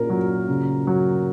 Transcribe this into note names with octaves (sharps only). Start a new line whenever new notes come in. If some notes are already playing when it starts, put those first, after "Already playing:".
Already playing: A#2 C#4 A#4
F#3
C#3
F#3